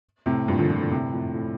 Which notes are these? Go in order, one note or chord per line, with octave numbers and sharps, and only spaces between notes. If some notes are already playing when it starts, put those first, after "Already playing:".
A2 C3
G2 A#2
D3 F3
D3 F3
A#2 D3
A2 C3
F2 A2
A2